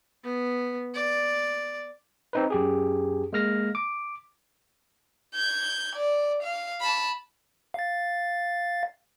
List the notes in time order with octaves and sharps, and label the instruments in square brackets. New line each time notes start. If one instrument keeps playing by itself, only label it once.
[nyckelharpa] B3
D5
[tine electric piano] C4 D#4 B4
F#2 G4 G#4
G#3 A#3 F6 A#6
D6
[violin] G6 G#6
D5
F5
A5 B5
[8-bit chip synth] F5 A6